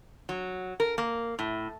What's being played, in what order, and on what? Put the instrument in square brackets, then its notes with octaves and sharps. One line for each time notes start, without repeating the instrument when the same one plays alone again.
[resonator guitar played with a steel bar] F#3
A#4
A#3
A2